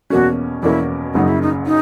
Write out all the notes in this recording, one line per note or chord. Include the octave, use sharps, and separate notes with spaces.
E2 B2 A#3 C#4 F#4
E2 B2 A#3 C#4 E4
F#1 F#2 C#3 F#3 D#4
E4
D#4
D#4